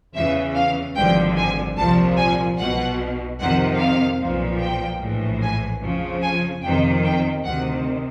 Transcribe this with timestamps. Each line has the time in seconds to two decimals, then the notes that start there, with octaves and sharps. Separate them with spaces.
0.14 E2 C#3 E3 E5
0.55 F5
0.95 G#1 G2 D3 F3 G5
1.37 G#5
1.76 C2 A#2 F3 A5
2.17 G#5
2.57 B1 B2 F#5
3.39 F2 C3 D#3 F#5
3.79 F5
4.20 B1 A#2 F3
4.60 G5
5.01 A#1 A2 E3
5.42 G#5
5.81 F2 C#3 F3
6.22 G#5
6.63 G1 F2 C3 D#3 G5
7.04 G5
7.44 D2 C3 D#3 F#5